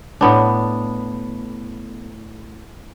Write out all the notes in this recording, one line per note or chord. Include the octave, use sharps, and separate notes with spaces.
A2 B3 D4